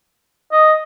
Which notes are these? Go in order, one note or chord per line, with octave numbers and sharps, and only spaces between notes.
D#5